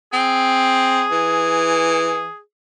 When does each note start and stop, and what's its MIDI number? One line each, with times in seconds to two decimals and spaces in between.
0.13 1.05 60
0.13 2.40 68
1.12 2.27 52